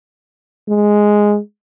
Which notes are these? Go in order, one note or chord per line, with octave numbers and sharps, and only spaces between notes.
G#3